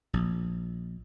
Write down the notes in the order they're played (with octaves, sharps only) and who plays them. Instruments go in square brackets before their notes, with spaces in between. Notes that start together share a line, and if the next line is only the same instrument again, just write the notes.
[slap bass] A#1